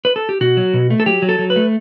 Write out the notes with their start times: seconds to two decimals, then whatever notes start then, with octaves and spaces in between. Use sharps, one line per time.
0.05 B4
0.16 A4
0.29 G4
0.41 B2 F#4
0.57 F#3
0.74 B2
0.90 A3
1.00 A4
1.06 F#3 G4
1.22 F#3
1.29 A4
1.39 F#3
1.50 B4
1.56 A3